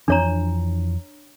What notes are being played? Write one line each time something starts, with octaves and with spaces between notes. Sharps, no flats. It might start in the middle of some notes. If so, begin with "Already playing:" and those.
F2 E3 F3 D4 C#5 A#5